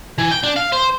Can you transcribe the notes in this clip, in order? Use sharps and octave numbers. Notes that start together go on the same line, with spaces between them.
E3
G5
D4
F5
C5